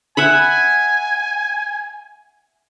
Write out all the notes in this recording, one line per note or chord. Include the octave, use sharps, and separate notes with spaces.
E5 F#5 G#5 B5